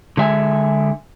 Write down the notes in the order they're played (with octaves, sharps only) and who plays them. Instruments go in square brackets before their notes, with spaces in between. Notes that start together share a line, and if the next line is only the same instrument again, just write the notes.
[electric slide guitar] D3 G#3 E5 G#5